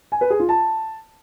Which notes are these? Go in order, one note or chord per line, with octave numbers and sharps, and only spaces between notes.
G#5
B4
G#4
F4
A5